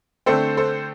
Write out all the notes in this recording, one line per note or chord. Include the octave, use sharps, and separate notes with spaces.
D3 A3 C4 A4 C5
A4 C5